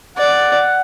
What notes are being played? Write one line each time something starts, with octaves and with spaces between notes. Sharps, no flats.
D5 F#5